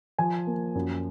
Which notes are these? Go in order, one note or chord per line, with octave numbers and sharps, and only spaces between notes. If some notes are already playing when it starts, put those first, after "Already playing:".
F3 G#5
A#3
F#2